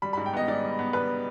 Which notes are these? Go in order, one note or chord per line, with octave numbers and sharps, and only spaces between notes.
G3 B5
B5
G#2
G5
B3 D#5
G#2 D5
G3
B3
G3 B4